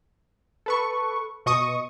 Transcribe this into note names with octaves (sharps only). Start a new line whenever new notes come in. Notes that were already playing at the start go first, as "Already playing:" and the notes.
A4 B4 C#6
B2 D#5 C#6 D#6